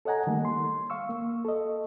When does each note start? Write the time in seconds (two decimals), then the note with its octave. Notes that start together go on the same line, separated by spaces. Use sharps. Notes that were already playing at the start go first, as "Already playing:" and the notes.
0.05 A4 C#5 D#5 F#5 G#5 A#5
0.27 D#3 G3 A3 A#3
0.45 C6
0.90 F5 C#6 E6
1.09 A#3
1.45 A4 D#5